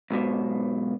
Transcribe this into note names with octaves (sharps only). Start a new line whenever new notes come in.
B1 G#2 B2